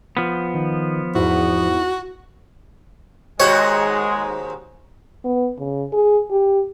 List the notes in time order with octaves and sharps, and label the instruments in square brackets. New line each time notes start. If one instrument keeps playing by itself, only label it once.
[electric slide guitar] F3 B3
[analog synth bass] D#3
[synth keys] E2 G#2 [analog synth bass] E4 [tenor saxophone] F#4
[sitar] D#2 G#2 F#4 [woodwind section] G#3 [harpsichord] C#5
[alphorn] B3
C#3
G#4
G4